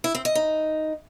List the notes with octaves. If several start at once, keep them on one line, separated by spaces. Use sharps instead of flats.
E4
C4
D#5
D#4